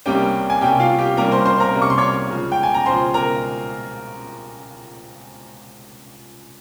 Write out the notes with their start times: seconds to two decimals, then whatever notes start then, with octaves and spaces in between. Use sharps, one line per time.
0.06 C2 C3 G3 A#3 C#4 G4 G5
0.50 G#5
0.61 C2 C3 G3 A#3 C#4 G4 G5
0.80 F4 F5
0.98 G4 G5
1.17 C2 C3 G3 A#3 C#4 A#4 A#5
1.32 C5 C6
1.46 C5 C6
1.60 A#4 A#5
1.74 C2 C3 G3 A#3 C#4
1.82 C#6
1.90 C6
1.98 C#5 C#6
2.30 C#2 C#3 F3
2.52 G5
2.63 G#5
2.74 A#5
2.86 C#2 C#3 F3 C5 C6
3.14 A#4 A#5